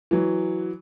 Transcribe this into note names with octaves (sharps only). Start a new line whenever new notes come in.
E3 F#3